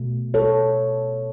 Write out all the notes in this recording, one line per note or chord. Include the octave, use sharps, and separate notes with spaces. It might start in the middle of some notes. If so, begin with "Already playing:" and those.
Already playing: B2 A3
A4 C#5